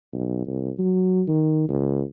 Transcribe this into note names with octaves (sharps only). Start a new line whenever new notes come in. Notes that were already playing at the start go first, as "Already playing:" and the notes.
B1
C2
F#3
D#3
C#2